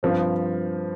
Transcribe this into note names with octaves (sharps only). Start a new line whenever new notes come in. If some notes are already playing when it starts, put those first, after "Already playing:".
G2 F3 C4